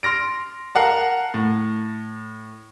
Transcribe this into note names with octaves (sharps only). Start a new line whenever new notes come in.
C6 F6 A#6 D7
A#4 F5 F#5 A5
A2